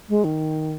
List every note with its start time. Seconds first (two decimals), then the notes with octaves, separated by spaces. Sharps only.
0.09 G#3
0.24 D#3